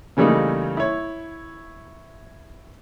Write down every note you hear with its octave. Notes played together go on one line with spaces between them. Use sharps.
C#3 E3 G3 A3 A#3 D#4
E4 C#5